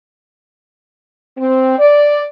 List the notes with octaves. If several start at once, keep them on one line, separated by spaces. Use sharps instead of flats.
C4
D5